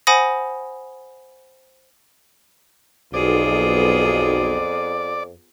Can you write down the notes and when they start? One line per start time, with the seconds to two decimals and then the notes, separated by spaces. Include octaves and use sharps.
0.07 C5 F#5 G#5 B5 D#6 A#6
3.14 B1 F2 B3 F4 G#4 D5